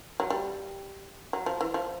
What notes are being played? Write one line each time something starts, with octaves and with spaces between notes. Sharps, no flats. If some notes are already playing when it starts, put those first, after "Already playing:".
F#3
G3
F#3
F3
E3
F3